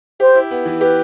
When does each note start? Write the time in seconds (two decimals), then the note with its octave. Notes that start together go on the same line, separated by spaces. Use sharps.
0.20 G4 C5
0.35 E4
0.51 B3
0.66 E3
0.81 G4 B4